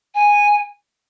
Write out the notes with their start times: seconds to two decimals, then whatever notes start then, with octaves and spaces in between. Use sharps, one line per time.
0.14 G#5